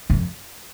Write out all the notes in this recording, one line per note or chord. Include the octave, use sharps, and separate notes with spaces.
F2